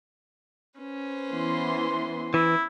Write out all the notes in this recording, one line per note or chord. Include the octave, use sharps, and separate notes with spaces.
C#4 B4 C5
E3 B3 C6
E3 E4